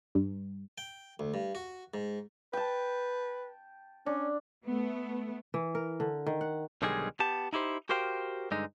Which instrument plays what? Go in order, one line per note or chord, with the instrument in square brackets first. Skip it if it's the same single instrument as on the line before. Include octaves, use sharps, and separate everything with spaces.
[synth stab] G2
[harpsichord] G5
D2
G2
F#4
G#2
[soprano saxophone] B4 [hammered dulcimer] G5 A5
[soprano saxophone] C#4 [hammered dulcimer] D4
[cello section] A3 B3
[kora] E3
A#4
D3
D#3
F#5
[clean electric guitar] B1 D3 D#3 G3 G#3 G#4
B3 G4 A5
D#4 E4 G4 C5
F#4 G4 A#4 C5 F5 G5
G2 D3 G#3 D#4